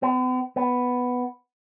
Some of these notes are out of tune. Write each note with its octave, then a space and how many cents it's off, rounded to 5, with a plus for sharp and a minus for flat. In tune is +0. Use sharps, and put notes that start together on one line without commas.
B3 +45
B3 +5